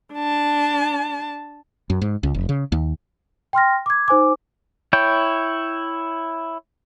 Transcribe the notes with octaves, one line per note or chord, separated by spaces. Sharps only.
D4 A5
F#2
G#2
C#2
F1
C#3
D#2
G5 C6 F6 A#6
D6 G#6
D#4 C5 G#5 D6
E4 C#5 G5